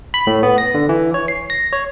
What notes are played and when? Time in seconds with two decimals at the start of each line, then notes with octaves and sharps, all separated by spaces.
0.14 B5
0.27 A2
0.43 B3
0.58 A#6
0.74 D3
0.89 E3
1.14 C#5
1.28 C7
1.50 A#6
1.72 C#5